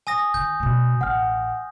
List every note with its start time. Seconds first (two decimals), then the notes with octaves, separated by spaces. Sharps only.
0.07 G#5 D#6 A#6
0.34 D#3 G6
0.60 B2 A3
1.01 A1 F#5 F6